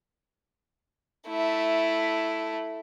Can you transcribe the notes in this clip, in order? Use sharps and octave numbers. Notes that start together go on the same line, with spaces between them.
A3 E4